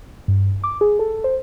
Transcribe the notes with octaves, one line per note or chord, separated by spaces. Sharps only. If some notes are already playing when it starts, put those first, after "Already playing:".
G2
D6
G#4
A4
C5